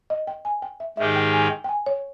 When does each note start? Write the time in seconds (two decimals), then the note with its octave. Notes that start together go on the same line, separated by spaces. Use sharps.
0.10 D#5
0.27 G5
0.45 G#5
0.62 G5
0.80 E5
0.97 G#2 D#3 G#3 D#4 G4 E5
1.16 G5
1.33 G#5
1.51 G5
1.64 G5
1.69 G#5
1.86 C#5